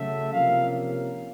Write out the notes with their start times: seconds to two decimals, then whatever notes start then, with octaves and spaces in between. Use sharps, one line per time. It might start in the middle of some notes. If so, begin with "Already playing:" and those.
Already playing: C#3 F#3 A3 E5
0.33 C3 F3 A#3 C#4 F5